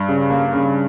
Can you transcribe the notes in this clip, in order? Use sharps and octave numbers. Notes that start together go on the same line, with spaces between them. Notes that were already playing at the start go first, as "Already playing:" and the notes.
Already playing: G2
C#3
A#3
C#3